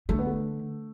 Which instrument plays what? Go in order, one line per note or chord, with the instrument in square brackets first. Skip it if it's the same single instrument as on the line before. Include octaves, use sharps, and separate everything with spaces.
[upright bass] D3 [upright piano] A3
[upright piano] B3
A3